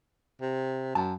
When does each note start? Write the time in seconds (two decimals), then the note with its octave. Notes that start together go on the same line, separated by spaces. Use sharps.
0.41 C3
0.95 F#2 A5